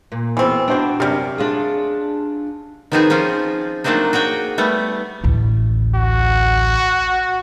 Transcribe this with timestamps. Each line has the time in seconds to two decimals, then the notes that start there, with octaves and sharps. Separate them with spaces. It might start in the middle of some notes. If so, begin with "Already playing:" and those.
0.12 A#2
0.37 E2 B2 E3 C4
0.68 B3 D4 F#4 C5
1.00 F#2 C3 G3 A#4
1.38 D4 F4 G#4
2.92 D#3 F3 B3 C4 D#4 G#4
3.10 F3 C4 C#4 F4
3.84 F#3 A3 A#3 C4 D4 D#4
4.13 F#4 G#4 C#5 G5
4.58 G3 A3 B3
5.24 A1 D2
5.95 F#4